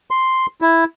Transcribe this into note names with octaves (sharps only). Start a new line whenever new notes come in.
C6
E4